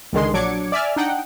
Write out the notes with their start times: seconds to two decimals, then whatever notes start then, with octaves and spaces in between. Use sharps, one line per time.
0.13 C#2 D3 D#3 G#3 C6
0.33 A#1 F#3 D4 D6 G#6 C#7
0.72 D5 E5 G#5 F6
0.96 D4 D#4 F#5 G5